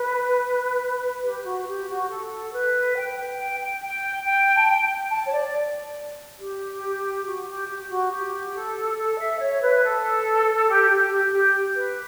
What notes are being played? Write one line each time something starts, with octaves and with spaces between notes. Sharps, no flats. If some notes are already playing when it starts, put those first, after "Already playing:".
Already playing: B4
G4
F#4
G4
F#4
A4
B4
G5
G5
G5
G5
G5
G5
A5
G5
A5
C#5
D5
G4
F#4
G4
G4
F#4
G4
A4
A4
E5
C#5
B4
A4
G4
G4
G4
G4
B4